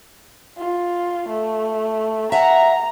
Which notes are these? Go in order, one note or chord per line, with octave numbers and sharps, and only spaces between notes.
F4
A3
E5 F#5 G#5 A#5